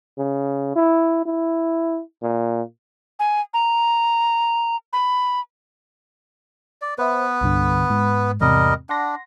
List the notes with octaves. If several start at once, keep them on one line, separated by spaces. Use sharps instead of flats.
C#3
E4
E4
A#2
G#5
A#5
B5
D5
B3 B4 C5 E5
C2 G2 D3
G#2
E2 G#2 C3 G3 A#4 D#5
D4 F#5 C6 A#6